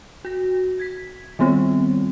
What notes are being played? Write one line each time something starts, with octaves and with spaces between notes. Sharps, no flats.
F#4 A#6
G#6 B6
D#3 G3 B3 C4 F4